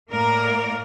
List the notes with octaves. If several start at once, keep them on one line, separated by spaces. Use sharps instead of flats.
A2 A#3 A#4 D5